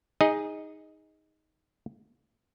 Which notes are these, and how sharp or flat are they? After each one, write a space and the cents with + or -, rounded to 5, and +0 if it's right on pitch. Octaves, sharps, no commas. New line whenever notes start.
D#4 +10 G#4 -15 D#5 +0